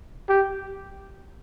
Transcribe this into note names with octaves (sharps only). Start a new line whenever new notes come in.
G4